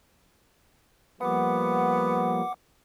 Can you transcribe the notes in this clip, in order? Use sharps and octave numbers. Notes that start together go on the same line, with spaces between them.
F3 G3 A#3 B3 F#5 D6